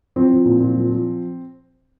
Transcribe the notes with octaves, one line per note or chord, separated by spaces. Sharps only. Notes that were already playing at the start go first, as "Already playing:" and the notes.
F3 C4
F3
A#2
A#2
F3
F3